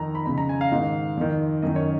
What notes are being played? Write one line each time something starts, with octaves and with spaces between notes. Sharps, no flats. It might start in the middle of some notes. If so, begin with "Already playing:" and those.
Already playing: F2 D#3 A#5
B5
F2 C#3 B5
A#5
G#5
F5
G#2 D#3
F2 D#3
F#2 D#3 D#5
C#5